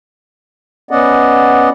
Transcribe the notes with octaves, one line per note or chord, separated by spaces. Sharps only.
B3 C#4 D5 D#5 F#5